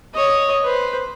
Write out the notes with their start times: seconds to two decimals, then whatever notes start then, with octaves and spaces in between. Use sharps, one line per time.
0.14 C#5 D#5
0.64 B4 C5